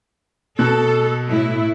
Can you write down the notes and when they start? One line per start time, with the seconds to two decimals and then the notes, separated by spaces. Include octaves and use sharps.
0.59 B2 A4 F#6
1.28 A2 E4